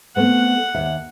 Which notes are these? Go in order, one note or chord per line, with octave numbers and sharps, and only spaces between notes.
A3 B3 C4 F#5
D#2 E5